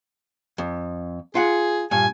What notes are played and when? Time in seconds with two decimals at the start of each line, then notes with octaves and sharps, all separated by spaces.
0.58 F2
1.35 F4 G#4 F#5
1.91 G2 A#2 G#5